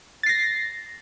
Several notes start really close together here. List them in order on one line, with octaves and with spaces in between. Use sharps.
A6 C7 A#6